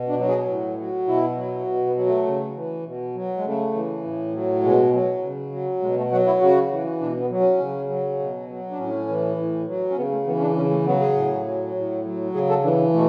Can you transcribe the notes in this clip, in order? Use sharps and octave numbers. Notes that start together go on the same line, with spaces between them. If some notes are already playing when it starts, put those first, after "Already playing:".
Already playing: B2
D4
F#3
G#4
A2
F#3
B2 E4
F#3
B2
B3
F#3
A3
C#3
E3
B2
F#3
G#3
C#3 A3
E3
A2
F#3
B2 G#3
F#3
C#3
F#3
B2 G#3
A3
F#3 F#4
E4
C#3 F#4
E3
B2 D4
B3
F#3
C#4
C#3
F#3
B2
F#3
D4
A2 C#4
E3
A2
F#3
C#4
C#3 B3
A3
E3 B3
C#4
D4
C#3 C#4
A3
F#3 B3
G#4
A2
F#3
A2
F#3
C#3 G#4
A4
E3 D4
B2 A3